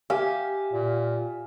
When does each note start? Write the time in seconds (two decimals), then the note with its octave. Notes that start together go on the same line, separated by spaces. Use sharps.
0.10 G4 E5 F5 G#5
0.72 A#2